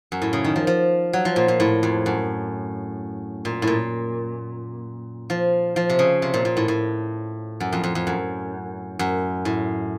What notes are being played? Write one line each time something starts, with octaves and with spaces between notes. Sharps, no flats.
F#2
A2
C#3
D#3
F3
F3
F#3
F3
A#2
A#2
A2
F2
F#2
A#2
A2
A#2
F3
F3
C3
C#3
C3
A#2
A#2
A2
A2
F#2
F2
F2
F2
F#2
F#2
A2